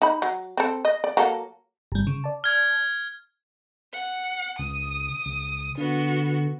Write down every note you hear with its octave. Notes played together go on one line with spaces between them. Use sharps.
D#4 B5
F#3
C4 A4
D#5
D5
F#3 A#3 A4
G1 G3
C#3
D5 A5
F6 G#6
F#5
C#2 D#6
C#2
D3 B3 F#4